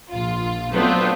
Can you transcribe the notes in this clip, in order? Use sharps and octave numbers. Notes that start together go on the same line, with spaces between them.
A#1 F4
F#3 A3 B3 C4 D4 F4